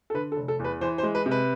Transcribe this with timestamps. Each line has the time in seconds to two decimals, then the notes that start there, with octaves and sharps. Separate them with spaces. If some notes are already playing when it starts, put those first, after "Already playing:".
0.10 A4
0.14 D3 B4
0.32 A4
0.36 F1
0.48 A4
0.59 E2
0.64 B4
0.81 E3 C5
0.98 C5
1.03 G#3
1.15 B4
1.26 C3
1.31 B4